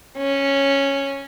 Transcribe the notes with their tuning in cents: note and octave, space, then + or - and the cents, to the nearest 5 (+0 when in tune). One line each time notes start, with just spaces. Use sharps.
C#4 -5